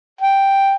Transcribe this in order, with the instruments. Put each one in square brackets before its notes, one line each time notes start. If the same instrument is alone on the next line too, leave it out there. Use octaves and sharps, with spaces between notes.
[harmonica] G5